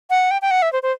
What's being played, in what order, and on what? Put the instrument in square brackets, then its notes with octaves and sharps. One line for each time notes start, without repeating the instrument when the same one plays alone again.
[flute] F#5
G5
G5
F#5
E5
C5
C5